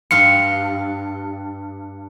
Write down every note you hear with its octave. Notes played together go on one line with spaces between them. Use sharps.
G2 F5 C6 C#7